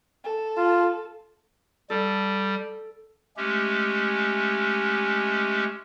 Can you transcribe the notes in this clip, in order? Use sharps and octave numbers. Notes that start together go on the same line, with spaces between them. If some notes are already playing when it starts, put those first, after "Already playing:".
A4
F4
G3 A4
G#3 A3 C#4 G4